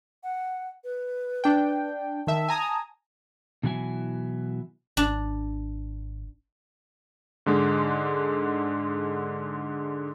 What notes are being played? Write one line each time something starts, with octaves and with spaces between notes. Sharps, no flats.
F#5
B4
D4 G5
D#3 E5 A5
G#5 A#5 D#6
B2 E3 F#3 E4 G#5
G#1 D4
G#2 D3 G#3